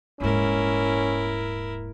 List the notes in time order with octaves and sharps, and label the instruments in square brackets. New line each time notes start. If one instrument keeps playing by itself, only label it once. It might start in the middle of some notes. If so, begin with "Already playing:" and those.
[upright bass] D#1 G#2 [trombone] C#4 [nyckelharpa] E4 A#4